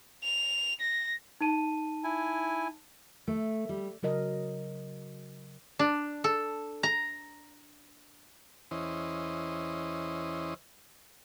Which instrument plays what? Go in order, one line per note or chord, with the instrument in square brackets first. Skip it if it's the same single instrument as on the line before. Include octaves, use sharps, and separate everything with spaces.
[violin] F7
A#6
[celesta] D#4 A5 D#7
[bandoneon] E4 G#5
[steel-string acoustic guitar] A3
G3
[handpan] C#3 F#3 A#4 D#5
[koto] D4
A4
A#5
[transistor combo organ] E2 E3 C#4 C5 D#5